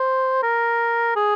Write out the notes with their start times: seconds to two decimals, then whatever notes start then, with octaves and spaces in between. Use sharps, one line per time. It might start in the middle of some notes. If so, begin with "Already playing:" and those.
Already playing: C5
0.43 A#4
1.16 G#4